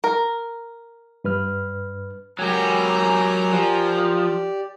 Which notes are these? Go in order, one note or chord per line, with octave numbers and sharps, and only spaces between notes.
A#4
G2 B4 F6
F#3 G4 A#4 G#5 A#5
F3 G4 D5